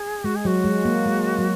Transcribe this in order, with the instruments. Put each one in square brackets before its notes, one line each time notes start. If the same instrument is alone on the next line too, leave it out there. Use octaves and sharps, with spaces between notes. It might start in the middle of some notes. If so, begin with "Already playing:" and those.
Already playing: [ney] G#4
[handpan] G#3 [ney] F#4
[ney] G#4
[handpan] F#3 [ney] F#4
[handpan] G#3
A#3
G#3
F#3